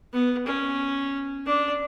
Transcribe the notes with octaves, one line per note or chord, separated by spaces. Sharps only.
B3
C#4
D4